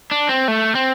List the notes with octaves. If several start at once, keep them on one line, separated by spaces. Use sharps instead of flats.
D4
C4
A3
C4